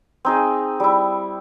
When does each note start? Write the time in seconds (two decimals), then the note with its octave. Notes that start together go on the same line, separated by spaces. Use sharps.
0.25 C4 D#4 G#4
0.80 G3 E4